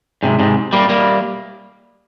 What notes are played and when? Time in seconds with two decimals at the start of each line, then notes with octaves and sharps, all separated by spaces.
0.23 G#2 C3
0.39 G#2 C3
0.73 G3 A#3
0.89 G3 A#3